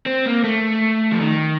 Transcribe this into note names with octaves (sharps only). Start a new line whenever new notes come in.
C4
A#3
A3
F3
D#3